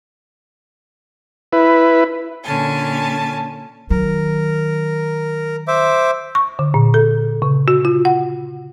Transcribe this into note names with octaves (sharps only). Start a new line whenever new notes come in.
E4 B4
A#2 D3 C#4 G#5 A5
D#3 F#3 A#4
C5 E5 D6
C#6
D3
A#2
A4
C#3
F#4
F4
F#5